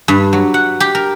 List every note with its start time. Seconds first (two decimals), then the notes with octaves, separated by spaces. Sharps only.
0.08 G2
0.33 F#3
0.54 F#5
0.80 G4
0.95 A#4